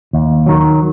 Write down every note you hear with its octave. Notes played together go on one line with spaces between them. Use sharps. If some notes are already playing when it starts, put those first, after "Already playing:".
D#2
D#3 F#3